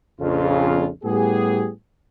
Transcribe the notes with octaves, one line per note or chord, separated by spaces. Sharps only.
A#1 F2 C#3 F4
A2 G3 B3 G4 G#4